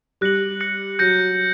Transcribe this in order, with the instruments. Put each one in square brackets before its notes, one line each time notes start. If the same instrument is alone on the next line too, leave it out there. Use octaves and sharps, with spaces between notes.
[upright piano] G3 [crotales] F#6 A#6 C#7 F#7
[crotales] F#6 A#6 C#7 F#7
[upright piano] F#3 [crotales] G6 A#6 C#7